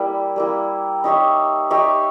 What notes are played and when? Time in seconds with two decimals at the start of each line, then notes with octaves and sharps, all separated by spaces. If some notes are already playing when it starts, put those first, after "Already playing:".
Already playing: G3 A#3 E4
0.36 G3 A#3 E4
1.04 D#4 G4 C#5 E5
1.70 D#4 G4 C#5 E5